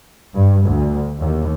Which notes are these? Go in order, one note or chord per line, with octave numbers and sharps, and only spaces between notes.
G2
D2
D#2